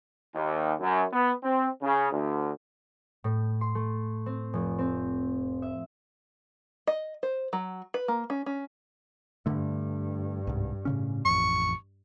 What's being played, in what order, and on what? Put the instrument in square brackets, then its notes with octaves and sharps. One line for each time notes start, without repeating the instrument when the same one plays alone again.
[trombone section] D#2
F#2
B3
C4
C#3
D2
[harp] A2
C6
A3
C4
F1
C4
E5
[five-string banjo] D#5
C5
F#3
B4
A#3
C#4
C#4
[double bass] G2 [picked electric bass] D3 A3
[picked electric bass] C2 G#2
A2 C#3 C#4
[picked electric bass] A1 F2 [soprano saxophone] C#6